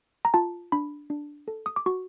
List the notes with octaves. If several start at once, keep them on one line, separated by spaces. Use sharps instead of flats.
A#5
F4 A5
D4 B5
D4
A4
D#6
D6
F#4 C#6